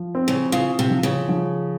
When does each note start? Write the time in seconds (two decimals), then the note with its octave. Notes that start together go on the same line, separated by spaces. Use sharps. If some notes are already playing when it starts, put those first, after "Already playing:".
Already playing: F3
0.15 C4
0.28 C#3
0.52 C#3 F4
0.79 C3
0.90 F3
1.03 C#3
1.29 F3